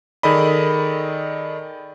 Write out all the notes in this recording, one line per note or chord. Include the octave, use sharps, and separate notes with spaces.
D#3 G#4 A4 D5 D#5 B5